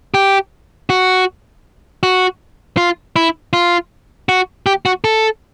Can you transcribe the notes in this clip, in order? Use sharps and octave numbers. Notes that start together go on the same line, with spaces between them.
G4
F#4
F#4
F4
E4
F4
F#4
G4
F#4
A4